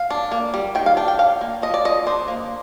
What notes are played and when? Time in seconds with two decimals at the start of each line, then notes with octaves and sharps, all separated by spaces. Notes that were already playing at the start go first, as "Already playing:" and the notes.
Already playing: F5
0.10 D4
0.31 A#3
0.54 G3
0.75 D#3 G5
0.86 F5
0.97 D4 G5
1.08 G5
1.19 D4 F5
1.41 A#3
1.62 F3 D#5
1.74 D5
1.85 F3 D#5
2.07 D4 C5
2.28 A#3